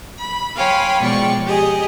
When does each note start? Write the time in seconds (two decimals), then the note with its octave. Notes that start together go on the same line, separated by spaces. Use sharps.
0.18 B5
0.57 C#5 F5 G5 G#5 B5 C6
1.01 B2 F3 G#3 D5 G5 C#6
1.47 G4 G#4 D#5